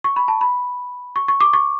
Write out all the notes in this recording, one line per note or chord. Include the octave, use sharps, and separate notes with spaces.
C#6
B5
A5
B5
C#6
C#6
D6
C#6